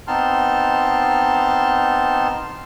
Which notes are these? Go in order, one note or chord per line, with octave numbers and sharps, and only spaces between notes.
B3 C4 D#4 A5 C6 F6